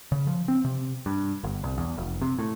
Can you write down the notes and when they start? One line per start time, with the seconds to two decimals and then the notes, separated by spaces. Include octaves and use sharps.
0.12 C#3
0.27 F3
0.48 C4
0.64 C3
1.06 G2
1.44 G1
1.63 C2
1.78 E2
1.97 F1
2.21 C3
2.38 A2